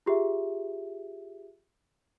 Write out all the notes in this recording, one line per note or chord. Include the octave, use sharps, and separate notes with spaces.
F4 G4 G#4 E5